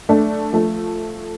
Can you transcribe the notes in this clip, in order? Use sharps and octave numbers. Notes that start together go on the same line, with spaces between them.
A3 D4
F3 A3